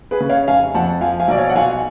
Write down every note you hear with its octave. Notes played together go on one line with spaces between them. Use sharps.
G#4 B4
C#3
C#5 F5
F1 F5 G#5
F2 F#5 A5
F3 F5 G#5
F5 G#5
B1 D5
C#5 F5
F#5
B1 F5 G#5